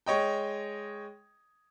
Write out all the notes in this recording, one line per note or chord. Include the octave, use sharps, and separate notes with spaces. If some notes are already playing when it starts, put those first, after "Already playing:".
G#3 C#5 D#5 G5